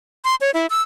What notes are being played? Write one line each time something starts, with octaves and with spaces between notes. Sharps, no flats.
C6
C#5
E4
E6